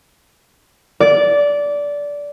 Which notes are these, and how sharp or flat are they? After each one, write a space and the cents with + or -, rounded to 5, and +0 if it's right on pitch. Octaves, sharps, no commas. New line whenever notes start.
D5 -15